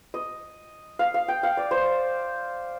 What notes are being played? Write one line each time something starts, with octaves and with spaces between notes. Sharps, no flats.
D#5
F5
F5
G5
F5
D5
C5